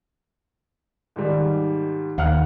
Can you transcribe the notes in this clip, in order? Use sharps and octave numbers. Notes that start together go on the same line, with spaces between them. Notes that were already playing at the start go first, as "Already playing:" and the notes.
G#2 D#3 G3
D#2 F5 F#5 F6